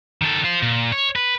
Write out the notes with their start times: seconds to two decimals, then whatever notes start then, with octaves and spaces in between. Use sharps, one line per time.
0.22 D#3 A4
0.44 F4 C5
0.62 A#2
0.92 C#5
1.16 B4